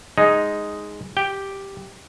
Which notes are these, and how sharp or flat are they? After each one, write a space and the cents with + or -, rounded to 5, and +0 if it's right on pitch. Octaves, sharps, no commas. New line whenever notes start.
G#3 +0 D#4 +0 D#5 +0
G4 +0 G5 +0